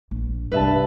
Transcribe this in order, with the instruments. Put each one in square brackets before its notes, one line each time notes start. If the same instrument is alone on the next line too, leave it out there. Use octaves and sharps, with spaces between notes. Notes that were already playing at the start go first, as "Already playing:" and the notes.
[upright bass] A#1
[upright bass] C2 C#3 [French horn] G2 [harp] B4 E5 A5